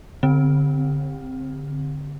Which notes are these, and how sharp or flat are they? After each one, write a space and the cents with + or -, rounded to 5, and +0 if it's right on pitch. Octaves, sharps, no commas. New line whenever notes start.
D3 -25 C4 +0